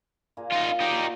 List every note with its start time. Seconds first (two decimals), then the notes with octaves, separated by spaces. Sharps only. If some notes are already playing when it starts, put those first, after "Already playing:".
0.37 A#2 A#3 G#4
0.52 D#4 F4
0.80 D#4 F#4 G4